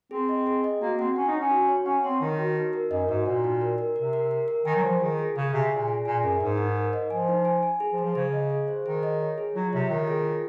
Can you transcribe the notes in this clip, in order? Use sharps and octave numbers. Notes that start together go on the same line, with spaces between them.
C4 G#4
D#5
G#4
D#5
A#3 F#4
C4 F#5
C#4 F#5
D#4
C#4 C#5
F#4
C#5
C#4 F#5
C4 C#5
D#3 D#4
F#4
D#4
A#4
F#2 D#5
G#2 F#4
A#2 F#4
D#4
A#4
A#4
C3 A#4
A#4
A#4
A#4
D#3 G#5
F#3
F3 F4
D#3 G#4
G#4
C#3 G#4
C3 G#5
A#2 G#4
G#4
A#2 G#5
F#2 G#4
G#2 A#4
D#4
A#4
D#5
F3 G#5
D#4
G#5
G#5
G#4
F3
G#4
F3
C#3 G#4
D#5
G#4
C5
D#3 G#4
D#5
C#5
G#4
F#3 F4
C3 C#5
D#3 F4
G#4
F4